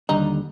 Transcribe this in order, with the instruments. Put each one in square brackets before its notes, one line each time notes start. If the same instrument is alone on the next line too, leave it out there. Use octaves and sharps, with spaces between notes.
[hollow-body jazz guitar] D#2 D3 G3 D4 [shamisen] D#4